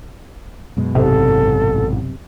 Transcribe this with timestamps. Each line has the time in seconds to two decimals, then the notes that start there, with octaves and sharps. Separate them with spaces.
0.77 F#2 B2 G#3
0.95 A1 G#2 C3 A4